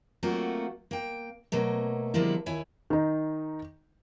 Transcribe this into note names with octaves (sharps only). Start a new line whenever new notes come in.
F#3 A3 A#3 C4 F4 F#4
A#3 G5
B2 F#3 A3 A#3
D3 F3 G3 G#3 A#3 E4
D#2 E4 C#5 G#5
D#3 D#4